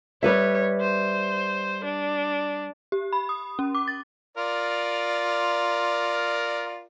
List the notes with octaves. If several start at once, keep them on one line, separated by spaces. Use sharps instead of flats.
G3 B4 C#5 E5
C5
D4
G4
B5
D#6
C#4
D6
A6
F4 A#4 D5